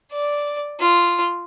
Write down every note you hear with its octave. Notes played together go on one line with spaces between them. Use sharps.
D5
F4